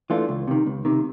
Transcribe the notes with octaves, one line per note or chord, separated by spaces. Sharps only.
E3 A3 D4 F4
C#2
C3 D#3
C#2
C3 D#3